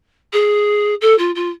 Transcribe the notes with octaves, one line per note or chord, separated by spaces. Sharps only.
G#4
A4
F4
F4